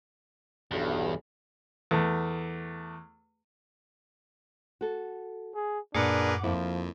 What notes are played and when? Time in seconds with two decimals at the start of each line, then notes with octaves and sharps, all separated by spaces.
0.71 B1 E2 G2
1.91 E2 A3
4.81 F#4 A4
5.55 G#4
5.95 F#2 A#2 D4 G#4 A#4 B4 F#5 D6
6.43 F2 F3 A#3 E4